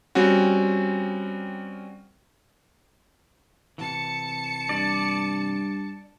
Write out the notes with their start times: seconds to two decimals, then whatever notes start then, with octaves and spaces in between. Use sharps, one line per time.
0.15 G3 C4 C#4 F#4
3.78 C3 E3 A5 C#7
4.69 G2 D5